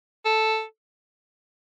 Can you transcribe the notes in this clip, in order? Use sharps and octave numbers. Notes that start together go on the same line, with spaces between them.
A4